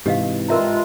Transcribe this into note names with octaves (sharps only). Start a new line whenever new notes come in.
G#2 C3 E3 G4 D#5 F5
G2 G#3 F4 A#4 E5 A#5